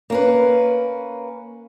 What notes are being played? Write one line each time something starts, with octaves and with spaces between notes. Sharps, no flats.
A#3 C#4 B4